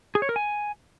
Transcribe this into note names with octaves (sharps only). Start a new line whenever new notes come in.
G#4
C#5
A#4
G#5